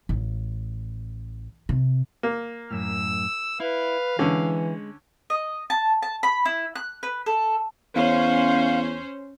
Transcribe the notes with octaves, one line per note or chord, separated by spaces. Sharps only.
A1
C3
A#3
F#2 A2 E6
E4 B4 F5
D3 E3 G#3 C#4
D#5
A5
A5
B5
E4
F#6
B4
A4
E2 C#4 C5 F5